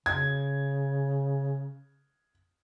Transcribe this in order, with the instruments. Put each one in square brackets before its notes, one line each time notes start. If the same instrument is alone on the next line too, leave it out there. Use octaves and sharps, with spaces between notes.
[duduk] C#3 [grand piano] G#6